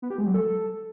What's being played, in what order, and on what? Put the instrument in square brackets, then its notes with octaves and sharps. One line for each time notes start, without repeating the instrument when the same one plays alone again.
[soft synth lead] B3
G4
G#3
F#3
A4